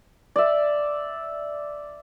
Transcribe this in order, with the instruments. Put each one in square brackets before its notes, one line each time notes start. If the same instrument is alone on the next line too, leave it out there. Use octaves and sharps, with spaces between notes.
[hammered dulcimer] D5 E5